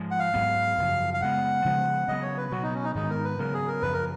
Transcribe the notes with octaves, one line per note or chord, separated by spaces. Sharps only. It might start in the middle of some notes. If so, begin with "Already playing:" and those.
Already playing: G#2 F3 G#3
F#5
F5
G#2 F#3 B3
F#2 C#3 F3
F5
C#3 G#3 B3 F#5
C#3 F3 G#3 B3
C#3 F#3 B3 D#5
C#5
B4
B2 F#3 B3 F#4
D#4
C#4
D#4
G#2 D#3 G#3 B3 D#4
A#4
B4
C#3 F#3 B3 A#4
G#4
A#4
F#2 C#3 F3 B4
A#4